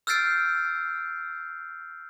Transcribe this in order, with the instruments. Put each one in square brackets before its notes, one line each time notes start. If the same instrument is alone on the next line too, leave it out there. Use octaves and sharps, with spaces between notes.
[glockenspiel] E6 F6 G6 A6 C7 D7